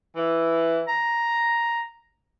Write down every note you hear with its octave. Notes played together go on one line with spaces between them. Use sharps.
E3
A#5